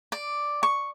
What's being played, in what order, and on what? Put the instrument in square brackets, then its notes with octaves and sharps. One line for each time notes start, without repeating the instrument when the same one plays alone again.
[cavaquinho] D5
C#6